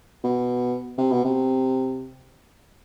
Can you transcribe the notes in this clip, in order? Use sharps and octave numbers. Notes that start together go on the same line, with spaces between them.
B2
C3
B2
C3